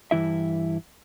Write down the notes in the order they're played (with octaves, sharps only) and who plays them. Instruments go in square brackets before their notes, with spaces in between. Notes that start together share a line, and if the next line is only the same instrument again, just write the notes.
[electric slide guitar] G2 E3 E4 E5